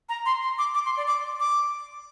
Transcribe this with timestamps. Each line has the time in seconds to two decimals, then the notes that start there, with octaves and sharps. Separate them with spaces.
0.09 A#5
0.26 C6
0.43 C6
0.58 D6
0.74 D6
0.85 C6
0.97 D5
1.07 D6
1.40 D6